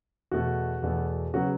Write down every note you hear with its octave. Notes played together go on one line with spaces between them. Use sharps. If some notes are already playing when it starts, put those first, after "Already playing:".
E2 B2 A3 F#4
E2 B2 A3
C#3 F#3 B3 F#4